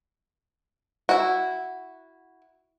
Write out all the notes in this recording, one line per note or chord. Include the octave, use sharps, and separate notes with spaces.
E4 F#4